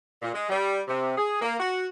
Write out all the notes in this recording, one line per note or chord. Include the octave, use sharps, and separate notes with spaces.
A#2
G#3
G3
C3
G#4
A#3
F#4